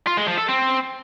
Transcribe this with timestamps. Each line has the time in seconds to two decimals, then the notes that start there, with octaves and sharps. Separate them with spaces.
0.07 F4
0.17 G#3
0.28 F3
0.38 A4
0.48 C4